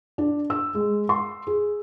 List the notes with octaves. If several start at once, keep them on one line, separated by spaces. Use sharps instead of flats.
D4
E6
G#3
C6
G#4